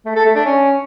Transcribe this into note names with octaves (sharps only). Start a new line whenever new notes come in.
A3
A4
A3
D4
C#4